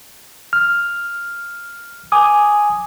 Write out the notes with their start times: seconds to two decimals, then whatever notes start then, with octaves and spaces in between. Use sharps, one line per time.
0.53 F6
2.12 G#5 D6 D#6